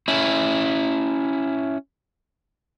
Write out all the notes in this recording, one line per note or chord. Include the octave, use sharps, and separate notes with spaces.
C#4 E4